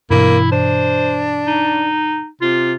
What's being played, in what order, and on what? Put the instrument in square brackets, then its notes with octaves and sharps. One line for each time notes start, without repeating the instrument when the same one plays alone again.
[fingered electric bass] G2 B2 E3 [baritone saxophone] A#3 [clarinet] E4
[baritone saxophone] D4 [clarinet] C5
[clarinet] D#4
[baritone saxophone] C3 [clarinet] F4